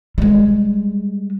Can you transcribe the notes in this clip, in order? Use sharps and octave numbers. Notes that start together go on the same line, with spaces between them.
G3 G#3